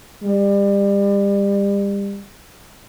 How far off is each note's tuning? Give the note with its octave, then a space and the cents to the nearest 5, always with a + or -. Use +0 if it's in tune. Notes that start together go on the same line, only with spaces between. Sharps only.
G3 +30